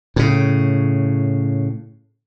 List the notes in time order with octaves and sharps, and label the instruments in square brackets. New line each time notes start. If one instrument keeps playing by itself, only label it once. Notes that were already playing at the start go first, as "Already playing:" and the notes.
[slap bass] A2 C#3